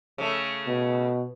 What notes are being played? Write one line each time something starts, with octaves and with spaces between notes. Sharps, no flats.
C#3 A3
B2